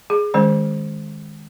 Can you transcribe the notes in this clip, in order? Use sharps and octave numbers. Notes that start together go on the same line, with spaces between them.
G#4
D#3 G#3 C#4 C5